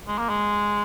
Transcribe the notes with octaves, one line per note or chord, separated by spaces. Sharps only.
G#3
A#3
G#3